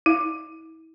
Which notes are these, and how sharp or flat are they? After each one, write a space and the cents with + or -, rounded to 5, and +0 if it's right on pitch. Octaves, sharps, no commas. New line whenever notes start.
E4 -35